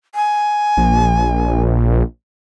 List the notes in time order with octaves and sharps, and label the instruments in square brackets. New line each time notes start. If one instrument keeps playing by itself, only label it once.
[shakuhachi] G#5
[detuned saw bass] A#1